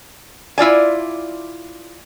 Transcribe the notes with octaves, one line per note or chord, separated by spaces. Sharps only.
E4 F4 D5 G#5